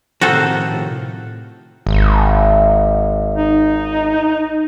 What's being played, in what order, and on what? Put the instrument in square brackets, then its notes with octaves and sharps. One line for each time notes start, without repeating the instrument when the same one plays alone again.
[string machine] A2 C3 [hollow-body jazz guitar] D#3 F3 [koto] F#4 A4 C5
[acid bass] G#1
[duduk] D#4